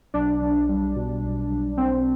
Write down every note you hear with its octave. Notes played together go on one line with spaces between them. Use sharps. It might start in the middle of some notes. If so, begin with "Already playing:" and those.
B1 D4
B1
G3
B2
B1
B1
B1 C4